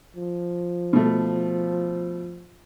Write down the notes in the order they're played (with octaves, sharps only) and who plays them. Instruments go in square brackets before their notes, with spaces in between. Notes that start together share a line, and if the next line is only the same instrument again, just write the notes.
[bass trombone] F3
[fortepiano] B2 A3